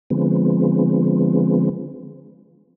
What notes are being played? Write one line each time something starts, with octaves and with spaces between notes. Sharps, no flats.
D3 F3 G#3 B3 C4